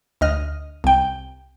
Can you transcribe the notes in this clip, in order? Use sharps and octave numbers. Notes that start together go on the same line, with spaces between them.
D2 D#5 F6
C2 G5